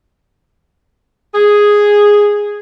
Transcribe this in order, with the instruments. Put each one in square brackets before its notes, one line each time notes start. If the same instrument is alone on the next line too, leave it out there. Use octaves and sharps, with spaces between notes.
[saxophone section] G#4